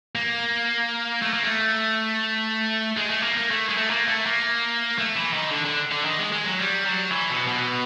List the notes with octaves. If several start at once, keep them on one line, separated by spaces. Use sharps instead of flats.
A#3
A3
A#3
A3
G#3
A3
A#3
A#3
A3
G#3
A3
A#3
A3
A#3
A3
E3
D#3
D3
D3
D3
D#3
G#3
G#3
F#3
G3
F#3
E3
B2
B2